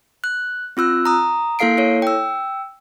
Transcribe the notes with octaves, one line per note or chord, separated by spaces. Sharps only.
F#6
C4 F4 E6 F#6
A#5 D#6
A#3 E4 A4 F5 C7 D7
E4 A4 C#5
G5 E6